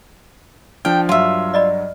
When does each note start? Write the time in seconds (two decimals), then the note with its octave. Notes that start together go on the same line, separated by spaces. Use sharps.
0.85 F3 D4 G5 F6
1.09 G2 F#3 F4 E5
1.54 D5 D#5 B5